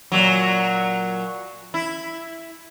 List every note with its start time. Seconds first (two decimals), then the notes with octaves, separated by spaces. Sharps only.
0.12 A#2 F#3
1.74 E4